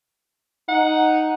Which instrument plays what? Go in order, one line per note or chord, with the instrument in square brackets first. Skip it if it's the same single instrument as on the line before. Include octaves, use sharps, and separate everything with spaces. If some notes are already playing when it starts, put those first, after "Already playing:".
[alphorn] D#4 [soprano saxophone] F#5